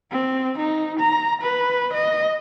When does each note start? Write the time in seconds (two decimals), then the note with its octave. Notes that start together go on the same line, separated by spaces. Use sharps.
0.12 C4
0.58 D#4
1.00 A#5
1.42 B4
1.94 D#5